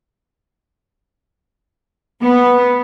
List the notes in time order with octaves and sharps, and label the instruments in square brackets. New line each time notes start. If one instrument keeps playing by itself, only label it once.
[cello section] B3